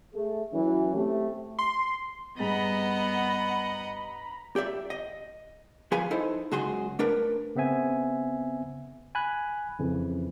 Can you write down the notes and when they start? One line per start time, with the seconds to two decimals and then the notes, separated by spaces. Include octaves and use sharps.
0.15 A3 G#4
0.53 E3 F#3 C#4
0.95 A3 C4 G4
1.59 C6
2.39 G2 B3 G#4 D#5 F#5 A#5 B5 A6
4.56 G4 D5 E5
4.90 D#5
5.92 F3 G#4 B4 F5 G#5
6.11 D#4 E4 A4 C5
6.51 C#2 F#2 F#4 G#4 C6
6.99 A3 D4 A#4 B4
7.55 C#3 B3 C4 E5 G#5
9.15 G#5 B5 F#6
9.79 F2 C#3 E3